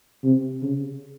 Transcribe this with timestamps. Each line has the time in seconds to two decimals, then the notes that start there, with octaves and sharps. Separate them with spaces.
0.24 C3
0.62 C#3